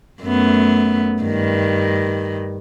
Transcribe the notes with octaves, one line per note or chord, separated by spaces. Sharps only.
F#2 A3 B3
G2 D#3